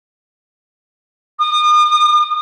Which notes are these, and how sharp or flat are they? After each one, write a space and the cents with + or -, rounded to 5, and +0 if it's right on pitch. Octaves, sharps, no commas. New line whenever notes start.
D#6 -40